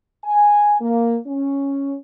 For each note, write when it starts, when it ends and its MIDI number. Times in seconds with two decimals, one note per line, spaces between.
0.25 0.76 80
0.81 1.18 58
1.27 1.96 61